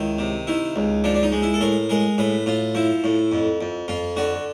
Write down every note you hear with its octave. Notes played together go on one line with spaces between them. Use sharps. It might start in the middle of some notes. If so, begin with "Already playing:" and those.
Already playing: C#2 D#3 E4
C3
D#3 E4
C#2
F3 D4
D4
D#4
G#3
E4
A4
A2 A#4
G#3 A#4
A2 B4
A2 F4
F3 E4
A2
F2
F2
F2 F4
D3 F#4